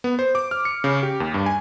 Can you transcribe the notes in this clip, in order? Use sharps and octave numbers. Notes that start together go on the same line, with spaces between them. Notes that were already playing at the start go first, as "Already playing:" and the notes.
B3
C5
D6
F6
C#7
C#3
G4
D#2
G2
G#5